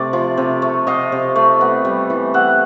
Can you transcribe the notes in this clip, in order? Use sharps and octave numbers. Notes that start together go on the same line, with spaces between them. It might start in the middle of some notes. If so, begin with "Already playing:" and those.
Already playing: C3 A3 D5
F3
C3
A3
C3 D#5 F5
C3
A3
B3
G3
E3
G3 E5 F#5